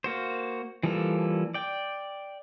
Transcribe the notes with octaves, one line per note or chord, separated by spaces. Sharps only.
A#3 F#4 C5
E3 F3 G3 A#3 A4
D5 G5